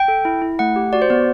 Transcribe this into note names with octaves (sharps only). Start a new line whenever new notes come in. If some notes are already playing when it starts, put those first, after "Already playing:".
Already playing: G5
A4
E4
E4
A3 F#5
G4
F#4 D5
C5
B3 D5